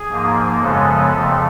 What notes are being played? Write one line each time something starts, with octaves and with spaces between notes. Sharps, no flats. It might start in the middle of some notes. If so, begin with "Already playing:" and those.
Already playing: G#4
G#2 F3 A#3
F#2 C#3 F3 G#3 B3 A4
F2 C#3 F3 A3